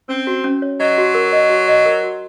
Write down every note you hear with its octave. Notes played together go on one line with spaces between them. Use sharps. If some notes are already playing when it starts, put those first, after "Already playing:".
C4 C#4
F#4
C#4
C#5
F#3 D#5
F#4
A#4
D#5
F#4
D#5
A#4
F#4